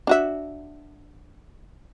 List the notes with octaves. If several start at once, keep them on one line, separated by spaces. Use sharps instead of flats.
D4 F#4 E5